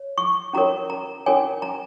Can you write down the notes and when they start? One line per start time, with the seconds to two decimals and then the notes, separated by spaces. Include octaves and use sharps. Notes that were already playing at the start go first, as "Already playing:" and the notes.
Already playing: C#5
0.18 C#6
0.53 C#4 F#4 A#4 C#5 A#5
0.90 A#5
1.26 C#4 F#4 A#4 C#5 G#5
1.62 A#5